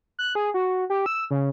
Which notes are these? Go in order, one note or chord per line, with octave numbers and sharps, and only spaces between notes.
F#6
G#4
F#4
G4
E6
C#3